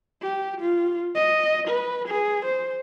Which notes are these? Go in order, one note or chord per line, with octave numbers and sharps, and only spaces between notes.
G4
F4
D#5
B4
G#4
C5